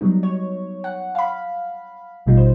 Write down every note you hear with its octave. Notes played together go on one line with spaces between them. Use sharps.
F#3 G3 B3 D#4
C#5
F#5
F5 B5
A1 B2 G3 D#4 F4
C5